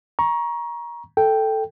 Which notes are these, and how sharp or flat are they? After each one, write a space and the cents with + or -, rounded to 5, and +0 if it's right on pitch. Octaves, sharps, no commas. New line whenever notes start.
A#5 +25 C#6 +0
A4 +0 G5 +0